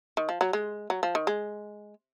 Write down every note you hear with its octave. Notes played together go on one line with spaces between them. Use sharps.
D#3
F3
F#3
G#3
F#3
F3
D#3
G#3